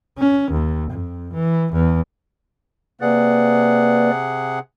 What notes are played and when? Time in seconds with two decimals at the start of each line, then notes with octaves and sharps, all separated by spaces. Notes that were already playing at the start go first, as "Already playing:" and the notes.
0.19 C#4
0.52 D#2
0.91 F2
1.34 E3
1.73 E2
3.01 C3 A#3 G#4 B4 D5 F#5